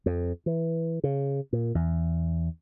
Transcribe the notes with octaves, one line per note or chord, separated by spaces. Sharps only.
F2
E3
C#3
A#2
E2